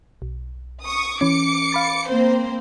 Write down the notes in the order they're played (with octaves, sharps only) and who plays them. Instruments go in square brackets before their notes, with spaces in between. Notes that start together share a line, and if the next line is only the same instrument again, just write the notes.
[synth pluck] B1
[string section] C#6 D#6
[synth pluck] E3 C#4 [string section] D6 C#7
[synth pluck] F5 B5 A6
[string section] A#3 C4 C5